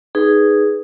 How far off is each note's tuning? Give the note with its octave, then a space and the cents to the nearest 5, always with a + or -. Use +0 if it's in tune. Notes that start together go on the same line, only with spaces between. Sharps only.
D#4 +0 G#4 +0 B4 +0